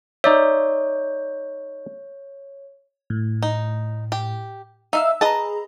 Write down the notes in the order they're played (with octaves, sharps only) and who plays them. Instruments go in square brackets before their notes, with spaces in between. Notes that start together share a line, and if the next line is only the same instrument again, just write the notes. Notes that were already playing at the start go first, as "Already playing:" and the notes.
[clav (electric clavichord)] D#4 D5 E5 [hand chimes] C#5
[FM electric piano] A2
[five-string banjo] D#4
G4
[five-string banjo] D#4 F5 [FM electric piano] E5 E6
[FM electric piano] G#4 A#5 [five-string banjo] B4 D#5 A5